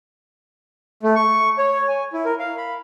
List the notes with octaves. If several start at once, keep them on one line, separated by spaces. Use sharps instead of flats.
A3
C#6
C#5
G#5
E4
A#4
F5
B5